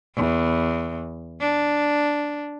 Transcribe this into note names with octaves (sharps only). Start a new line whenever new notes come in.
E2
D4